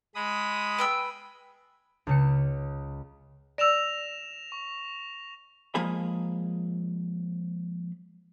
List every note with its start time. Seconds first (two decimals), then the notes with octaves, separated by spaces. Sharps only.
0.15 G#3 B5 D#6
0.78 B3 G5 E6
2.07 C#2 C#3 C#7
3.58 D5 E6 A#6 E7 F7
4.52 C#6
5.75 F3 G#3 A#3 G#4 G#5 B5